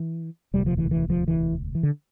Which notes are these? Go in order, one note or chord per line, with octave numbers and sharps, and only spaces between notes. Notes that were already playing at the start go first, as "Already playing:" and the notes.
Already playing: E3
E1 D2 C3 G3
F3
E3
E3
F3
E3
E3
D3